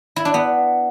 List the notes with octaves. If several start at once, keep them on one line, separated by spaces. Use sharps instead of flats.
E4
D4
B3